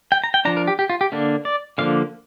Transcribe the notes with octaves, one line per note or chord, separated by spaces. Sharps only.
G5
A#5
G5
F3 D4 A#5
A#4
G4
G4
F4
G4
D3 A#3 D4
D5
D3 F3 A#3 D4 F5